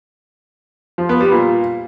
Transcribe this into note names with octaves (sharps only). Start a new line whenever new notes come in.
F3
B3
G3
A#2